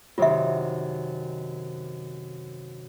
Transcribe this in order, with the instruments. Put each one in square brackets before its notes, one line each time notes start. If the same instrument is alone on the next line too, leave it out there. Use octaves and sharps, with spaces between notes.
[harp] F#2 C3 D#3 [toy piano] F4 E5